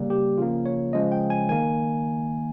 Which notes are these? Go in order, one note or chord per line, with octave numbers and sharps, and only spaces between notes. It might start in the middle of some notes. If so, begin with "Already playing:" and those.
Already playing: C#3 G3 A#3
G4
C#3 F3 A#3 F4
C#5
C#3 F3 G#3 D#5
G5
G#5
D#3 A#3 G#5